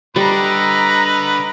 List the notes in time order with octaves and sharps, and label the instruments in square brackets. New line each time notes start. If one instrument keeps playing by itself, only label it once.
[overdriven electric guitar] D3 [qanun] G3 [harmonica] B4 [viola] D#5 A#5